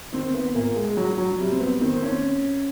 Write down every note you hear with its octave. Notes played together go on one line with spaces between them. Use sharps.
D#3 C4
B3
A#2 A#3
G#3
F#3
F#3
C3 G3
C4
B3
D#3 C4
C4
C#4